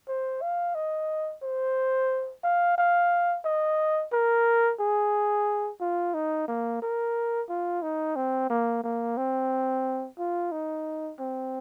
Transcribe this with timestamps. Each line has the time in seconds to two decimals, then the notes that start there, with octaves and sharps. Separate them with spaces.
0.08 C5
0.42 F5
0.75 D#5
1.43 C5
2.44 F5
2.78 F5
3.45 D#5
4.12 A#4
4.80 G#4
5.81 F4
6.14 D#4
6.48 A#3
6.82 A#4
7.49 F4
7.83 D#4
8.16 C4
8.50 A#3
8.84 A#3
9.17 C4
10.19 F4
10.52 D#4
11.20 C4